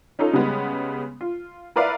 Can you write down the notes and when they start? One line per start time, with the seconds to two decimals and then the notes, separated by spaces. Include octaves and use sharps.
0.19 C#4 D#4 F4 A4
0.33 C#3 G3 G#3 B3
1.21 F4
1.76 E4 A#4 B4 D5 E5 F5